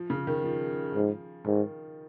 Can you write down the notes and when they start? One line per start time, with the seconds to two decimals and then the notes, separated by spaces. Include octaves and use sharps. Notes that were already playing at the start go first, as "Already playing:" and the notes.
Already playing: F3
0.10 C#3
0.27 D#3
0.44 F3
0.95 G#2
1.46 G#2 D#3